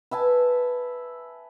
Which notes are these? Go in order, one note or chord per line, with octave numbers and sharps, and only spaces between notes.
B4 E5 G#5 A5